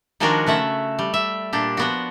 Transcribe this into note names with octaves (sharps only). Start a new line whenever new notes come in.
D#3 F3 G#3 D4 F#4 A#4
C#3 A3 E5 F#5
G3
E5
A#2 D4 G4
F3 B3 F#4